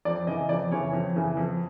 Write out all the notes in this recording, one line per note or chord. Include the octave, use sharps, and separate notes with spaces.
F2 D5
C#3 E3 D#5
F2 D5
C#3 E3 C#5
F2
C#3 E3
F2